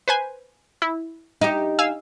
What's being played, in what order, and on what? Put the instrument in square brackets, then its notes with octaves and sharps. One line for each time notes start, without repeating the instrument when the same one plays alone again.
[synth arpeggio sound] B4 C5 G#5
E4
[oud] D#4 G4
[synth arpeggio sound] F5 G#5 E6